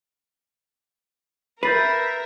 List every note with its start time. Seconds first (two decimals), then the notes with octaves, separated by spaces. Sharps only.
1.63 A#4 B4 E5 G6 A6 C7